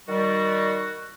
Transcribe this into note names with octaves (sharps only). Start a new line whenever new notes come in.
D#3 G3 F#4